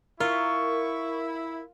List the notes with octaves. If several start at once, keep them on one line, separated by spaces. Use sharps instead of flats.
E4 F4 A#4 C#6